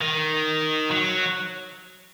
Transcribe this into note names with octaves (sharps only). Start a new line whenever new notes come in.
D#3
F#3